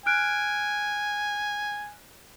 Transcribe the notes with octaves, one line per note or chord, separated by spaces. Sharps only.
G#5 F6 F#6 D7